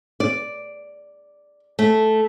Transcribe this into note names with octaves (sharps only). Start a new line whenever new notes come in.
D5
A3